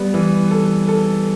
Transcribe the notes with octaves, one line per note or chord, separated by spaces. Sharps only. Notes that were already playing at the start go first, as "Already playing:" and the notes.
Already playing: G3 B3
E3
A4
A4